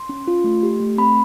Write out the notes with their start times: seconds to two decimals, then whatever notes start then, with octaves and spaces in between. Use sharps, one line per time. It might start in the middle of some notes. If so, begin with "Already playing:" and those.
Already playing: C6
0.09 C#4
0.28 F4
0.44 A3
0.63 G4
0.80 A3
0.98 C4 B5